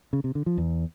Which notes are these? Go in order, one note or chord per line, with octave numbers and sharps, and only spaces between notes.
C#3
C3
D3
F3
E2